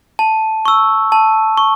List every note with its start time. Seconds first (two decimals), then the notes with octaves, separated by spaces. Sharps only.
0.19 A5
0.65 C#6 E6
1.12 A5
1.57 C#6